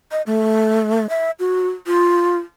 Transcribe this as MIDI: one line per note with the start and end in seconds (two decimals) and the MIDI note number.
0.12 0.22 75
0.26 1.09 57
1.10 1.31 76
1.39 1.70 66
1.86 2.38 65